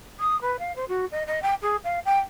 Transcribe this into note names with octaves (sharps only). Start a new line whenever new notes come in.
D#6
B4
F5
C5
F#4
D#5
D#5
G5
G#4
F5
G5